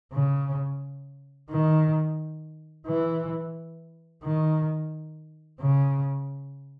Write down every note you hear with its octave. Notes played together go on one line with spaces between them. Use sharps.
C#3
D#3
E3
D#3
C#3